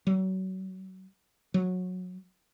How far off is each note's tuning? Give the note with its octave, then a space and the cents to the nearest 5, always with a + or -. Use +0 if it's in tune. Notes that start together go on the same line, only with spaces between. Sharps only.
F#3 +30
F#3 -20